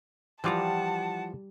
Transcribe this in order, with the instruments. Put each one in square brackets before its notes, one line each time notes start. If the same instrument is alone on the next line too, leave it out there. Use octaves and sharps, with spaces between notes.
[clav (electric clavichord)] E3 F3 F4 [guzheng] G3 D5 A#5 [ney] F#5 [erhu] A5